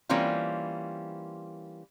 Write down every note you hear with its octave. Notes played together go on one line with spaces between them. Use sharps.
E3 G3 A#3 C4 C#4 F4